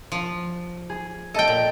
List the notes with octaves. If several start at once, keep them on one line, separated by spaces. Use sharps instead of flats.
F3
G#4
A4 D#5 G5 A5
A#2